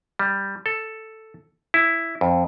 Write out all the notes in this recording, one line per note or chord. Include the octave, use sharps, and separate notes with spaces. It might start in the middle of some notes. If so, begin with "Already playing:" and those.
G3
A4
E4
F2